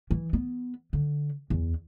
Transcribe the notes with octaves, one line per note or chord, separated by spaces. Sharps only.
E3
B3
D3
E2